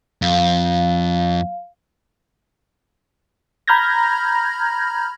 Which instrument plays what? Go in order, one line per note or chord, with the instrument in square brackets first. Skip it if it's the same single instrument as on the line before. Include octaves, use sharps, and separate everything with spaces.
[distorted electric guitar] F2 [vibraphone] F5
[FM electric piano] A#5 B5 F6 G6 G#6 A#6